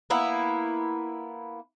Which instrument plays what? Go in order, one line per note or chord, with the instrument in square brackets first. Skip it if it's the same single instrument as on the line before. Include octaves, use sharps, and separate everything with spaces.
[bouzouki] A#3 B3 E4